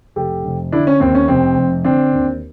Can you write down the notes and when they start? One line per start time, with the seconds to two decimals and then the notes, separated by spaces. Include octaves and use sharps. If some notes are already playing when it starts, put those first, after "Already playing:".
0.16 F1 G4 A4
0.45 F1
0.72 D3 D4 E4
0.87 C#4
1.00 D#2 C4
1.15 C#4
1.28 F1 C4
1.57 F1
1.84 D3 C4 D4
2.13 D#2